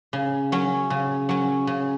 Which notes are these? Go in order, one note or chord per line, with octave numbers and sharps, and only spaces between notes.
C#3
F#3 C#4
C#3
F#3 C#4
C#3